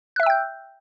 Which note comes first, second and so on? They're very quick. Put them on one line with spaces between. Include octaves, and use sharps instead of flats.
F#6 E5 E6 G5 G6